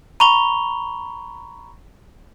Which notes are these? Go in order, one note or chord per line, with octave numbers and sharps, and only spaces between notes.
A#5 B5 C#6 F7 G7